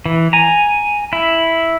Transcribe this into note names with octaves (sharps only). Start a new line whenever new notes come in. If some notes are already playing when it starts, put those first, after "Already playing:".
E3
G#5 A#5
E4